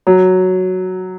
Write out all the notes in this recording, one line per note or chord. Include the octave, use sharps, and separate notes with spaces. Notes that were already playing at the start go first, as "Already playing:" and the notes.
F#3